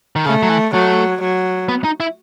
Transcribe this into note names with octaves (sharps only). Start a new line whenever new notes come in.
D#3
C#3 A3
F#3
E3
F#3 A3
F#3
B3
D#4
E4